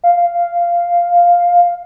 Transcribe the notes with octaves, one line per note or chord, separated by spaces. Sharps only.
F5